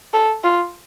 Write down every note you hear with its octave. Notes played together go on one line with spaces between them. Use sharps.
A4
F4